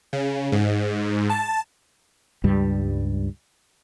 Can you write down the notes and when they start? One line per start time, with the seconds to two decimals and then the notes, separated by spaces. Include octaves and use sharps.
0.13 C#3
0.52 G#2
1.30 A5
2.44 C#2 G2 G3